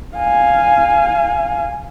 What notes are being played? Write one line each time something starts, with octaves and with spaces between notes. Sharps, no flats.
F5 G#5